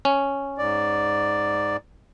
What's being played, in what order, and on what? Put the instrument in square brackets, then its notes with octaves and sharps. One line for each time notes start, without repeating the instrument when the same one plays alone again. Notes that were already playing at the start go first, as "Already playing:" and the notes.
[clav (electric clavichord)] C#4
[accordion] G#2 D5